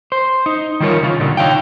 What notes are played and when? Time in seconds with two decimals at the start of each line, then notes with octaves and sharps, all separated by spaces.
0.12 C5
0.46 D#4
0.80 D#3 G3 F4 A#4 C#5
1.03 C#3 F4
1.20 A#2 D3 D#3 G3
1.37 D#4 C#5 F5 G5